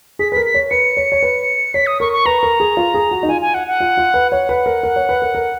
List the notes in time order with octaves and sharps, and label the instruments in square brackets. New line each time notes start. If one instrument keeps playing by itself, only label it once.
[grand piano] G#4 [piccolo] B6
[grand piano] A#4 B4 [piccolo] B6
[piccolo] B6
[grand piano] C#5
[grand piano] B4 [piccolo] C#7
[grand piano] C#5
C#5
B4
[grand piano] C#5 [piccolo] B6
[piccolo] D#6
[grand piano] A#4 [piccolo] C#6
[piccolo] C#6
[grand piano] B4 [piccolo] A#5
[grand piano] A#4
G#4
F4
G#4
F#4
D#4
[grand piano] F4 [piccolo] G#5
[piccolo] G#5
F#5
F#5
[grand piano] F4
F4
B4
[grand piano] C#5 [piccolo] F#5
[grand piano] B4
A#4
A#4
C#5
B4
A#4
A#4